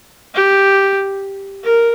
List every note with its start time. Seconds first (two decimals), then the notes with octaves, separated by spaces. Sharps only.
0.35 G4
1.64 A#4